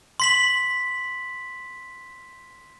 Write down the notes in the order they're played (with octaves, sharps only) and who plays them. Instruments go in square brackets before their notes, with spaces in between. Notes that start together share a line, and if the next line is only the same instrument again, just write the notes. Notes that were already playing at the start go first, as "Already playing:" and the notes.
[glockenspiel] C6 B6 F#7